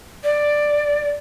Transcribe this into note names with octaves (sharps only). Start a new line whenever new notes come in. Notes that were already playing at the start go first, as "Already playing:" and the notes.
D5